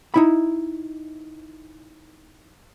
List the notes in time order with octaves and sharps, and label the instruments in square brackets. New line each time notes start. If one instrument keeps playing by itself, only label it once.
[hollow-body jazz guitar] D#4 E4 B5